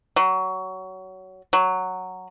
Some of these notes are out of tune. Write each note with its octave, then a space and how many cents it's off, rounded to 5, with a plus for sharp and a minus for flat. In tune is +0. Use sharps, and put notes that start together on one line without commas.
F#3 +20
F#3 +0